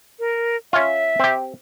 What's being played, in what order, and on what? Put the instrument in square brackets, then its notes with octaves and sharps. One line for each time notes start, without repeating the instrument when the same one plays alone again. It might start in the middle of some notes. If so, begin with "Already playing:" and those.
[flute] A#4
[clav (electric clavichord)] C#4 F4 [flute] E5
[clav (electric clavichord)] C4 G4